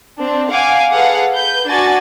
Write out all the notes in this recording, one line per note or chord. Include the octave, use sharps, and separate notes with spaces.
C4 D4
F5 F#5 G#5 D6
G#4 A4 B4 F5 F#5
B4 G6
D4 F#4 G#5 A6